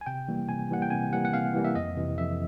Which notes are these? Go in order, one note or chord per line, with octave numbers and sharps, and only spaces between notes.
G#5
C3 G5
E3 G3 A#3
C3 G#5
E3 G3 A#3 F#5
G5
C3 G#5
E3 G3 A#3 F#5
F#5
C3 F5
E3 G3 A#3
E5
F2 D#5
C3 E3
F2 E5